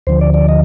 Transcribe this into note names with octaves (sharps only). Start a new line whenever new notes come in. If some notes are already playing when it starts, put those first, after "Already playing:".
D2 D3 F3 C5
D5
D5
D#5